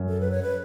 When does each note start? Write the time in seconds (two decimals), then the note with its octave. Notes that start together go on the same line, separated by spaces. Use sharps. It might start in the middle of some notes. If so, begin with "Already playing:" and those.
Already playing: F#2
0.09 A4
0.20 B4
0.31 C#5
0.42 B4